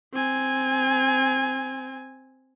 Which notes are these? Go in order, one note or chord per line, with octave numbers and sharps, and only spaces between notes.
C4 G#5